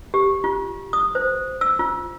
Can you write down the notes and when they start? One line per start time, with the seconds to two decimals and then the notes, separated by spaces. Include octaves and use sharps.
0.14 G4
0.44 F4
0.93 D#6
1.15 C5
1.61 E6
1.79 F4